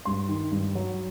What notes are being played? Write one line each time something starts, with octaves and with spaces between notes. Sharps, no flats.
G2 C6
D#3
G2
F#3